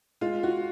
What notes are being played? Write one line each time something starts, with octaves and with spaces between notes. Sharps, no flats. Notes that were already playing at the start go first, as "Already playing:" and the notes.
G#3 F4
F#4